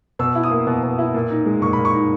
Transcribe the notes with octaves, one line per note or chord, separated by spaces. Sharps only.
B2 E6
E4
D#6
A#3
B2
B2
E4
A#2
D#4
G#3
A#2 C#6
A#2 B5
C#6
D#4